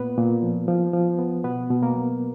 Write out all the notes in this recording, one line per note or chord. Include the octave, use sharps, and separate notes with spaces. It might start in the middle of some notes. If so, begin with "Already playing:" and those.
Already playing: A#2 A#3 B3 B4
A#2
F3
F3
F3
B3
B2 B3 B4
B2
A#3 A#4
F#3